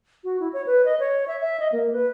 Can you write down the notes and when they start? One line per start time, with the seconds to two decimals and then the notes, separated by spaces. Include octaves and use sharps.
0.24 F#4
0.40 E4
0.53 C#5
0.66 B4
0.86 D#5
1.00 C#5
1.28 E5
1.41 E5
1.60 D#5
1.72 A#3
1.93 B4